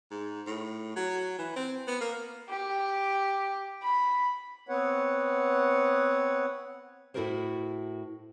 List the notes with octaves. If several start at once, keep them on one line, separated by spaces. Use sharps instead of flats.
G#2
A2
F#3
E3
C4
B3
A#3
G4
B5
B3 C4 B4 C#5 F#5
A2 E4 F#4 A4 A#4 C5